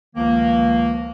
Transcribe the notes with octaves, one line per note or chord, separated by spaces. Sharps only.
C#2 D#3 F3 A#3